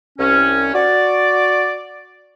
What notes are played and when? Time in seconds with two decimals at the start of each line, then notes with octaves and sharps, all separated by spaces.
0.19 C2 C#4
0.74 F#4 D5